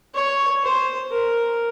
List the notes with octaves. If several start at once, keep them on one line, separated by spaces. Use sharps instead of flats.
C#5
C5
A#4